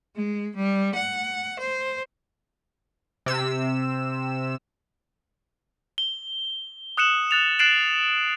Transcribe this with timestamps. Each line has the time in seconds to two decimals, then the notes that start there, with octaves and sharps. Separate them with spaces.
0.16 G#3
0.56 G3
0.95 F#5
1.59 C5
3.26 C3 E6
5.98 G7
6.97 D#6 F#6 C#7 E7 F#7
7.31 F#6 A6 F7
7.59 F#6 A6 C7 D7 E7 F#7